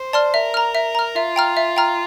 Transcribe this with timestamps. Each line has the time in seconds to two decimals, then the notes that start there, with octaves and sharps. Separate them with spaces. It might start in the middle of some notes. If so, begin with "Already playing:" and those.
Already playing: C5
0.13 D5 A5 C6 F6
0.34 A#4 E5
0.54 A#5 F6
0.75 E5
0.95 A#5 F6
1.15 F4 E5
1.36 G5 A#5 F6
1.57 E5
1.77 G5 A#5 F6